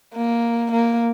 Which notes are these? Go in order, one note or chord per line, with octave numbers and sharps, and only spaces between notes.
A#3
A#3